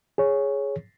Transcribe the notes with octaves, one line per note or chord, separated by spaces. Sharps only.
G#4 C#5